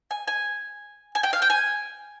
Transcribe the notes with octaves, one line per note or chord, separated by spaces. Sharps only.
G#5
G#5
G#5
G5
F5
G5
G#5